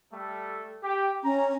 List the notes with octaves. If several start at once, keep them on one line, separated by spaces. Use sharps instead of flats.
G3 A3 A4
G4
C#4 A#5